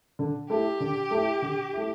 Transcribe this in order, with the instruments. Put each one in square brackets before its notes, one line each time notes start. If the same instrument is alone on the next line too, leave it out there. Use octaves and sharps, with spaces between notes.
[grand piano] D3
[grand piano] A3 E4 [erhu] G4
[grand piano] D3
A3 E4
D3
A3 E4